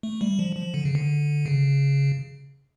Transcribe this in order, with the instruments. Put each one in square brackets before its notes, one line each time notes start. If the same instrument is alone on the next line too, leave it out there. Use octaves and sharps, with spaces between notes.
[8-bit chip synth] A3
G3
F3
F3
D3
C#3
D3
C#3